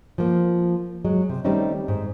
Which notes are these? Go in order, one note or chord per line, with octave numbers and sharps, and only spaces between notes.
F3 A#3
F#3 G#3
C3
D#3 G3 A3 C4 C#4 D#4
G#2